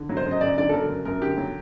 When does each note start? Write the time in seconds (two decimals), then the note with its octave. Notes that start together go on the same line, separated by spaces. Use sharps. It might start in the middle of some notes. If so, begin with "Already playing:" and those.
Already playing: D3
0.09 F#3
0.17 C5
0.26 F#2
0.31 D#5
0.41 F#2 D5
0.58 D3 D5
0.69 A4
0.74 F#3 A#4
0.89 F#2
1.05 F#2 A#4
1.21 D3 G4
1.38 F#3